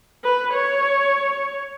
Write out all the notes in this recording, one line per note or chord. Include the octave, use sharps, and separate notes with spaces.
B4
C#5